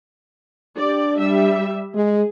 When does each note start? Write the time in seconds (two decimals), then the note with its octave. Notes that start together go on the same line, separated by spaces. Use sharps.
0.78 D4 G4 D5
1.19 G3 E5
1.95 G#3 G#4